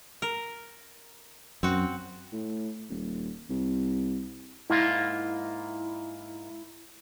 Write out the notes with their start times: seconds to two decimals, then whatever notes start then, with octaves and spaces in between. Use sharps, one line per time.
0.22 A#4
1.63 F#2 C4 F#4
2.32 A2
2.89 D#1
3.50 C2
4.69 G#2 A#3 E4 F4